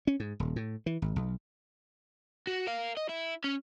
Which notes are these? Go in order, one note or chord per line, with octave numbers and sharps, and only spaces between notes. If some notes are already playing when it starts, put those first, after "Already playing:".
C#4
G#2
D#1
A2
E3
G#1
B1
F#4
A#4 F5
D#5
E4
C#4